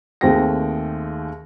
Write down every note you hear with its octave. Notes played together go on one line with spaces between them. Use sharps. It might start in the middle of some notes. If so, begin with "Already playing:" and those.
D#2 A3 C4 G#4 G5 A#6